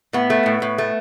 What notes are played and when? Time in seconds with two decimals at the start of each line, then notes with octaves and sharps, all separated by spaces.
0.13 A2 B3
0.30 A3
0.46 A2
0.62 A2
0.78 A3